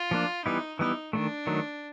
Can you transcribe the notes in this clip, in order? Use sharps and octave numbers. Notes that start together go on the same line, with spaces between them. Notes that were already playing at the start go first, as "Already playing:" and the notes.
Already playing: F4
F3 A#3 D4
E3 G3 B3 D#4 E4
E3 G3 B3 D#4 E4
D#3 F#3 A3 D4
D#3 F#3 A3